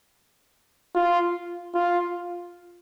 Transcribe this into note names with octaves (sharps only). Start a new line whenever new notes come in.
F4
F4